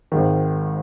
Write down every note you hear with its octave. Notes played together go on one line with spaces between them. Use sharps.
G#1 G#2 D#3